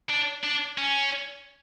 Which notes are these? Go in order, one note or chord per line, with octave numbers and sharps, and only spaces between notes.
D4
D4
C#4